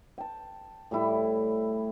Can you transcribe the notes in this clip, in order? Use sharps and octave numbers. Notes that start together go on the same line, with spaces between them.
G5 A5
A2 G3 E4